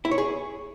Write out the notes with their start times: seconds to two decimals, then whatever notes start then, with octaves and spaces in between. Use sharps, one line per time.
0.05 E4
0.11 C#5
0.18 G#4